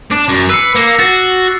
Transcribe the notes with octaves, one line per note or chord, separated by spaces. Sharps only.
D4 D6
F#2
B4 E6 C7 C#7
A#3
F#4 A6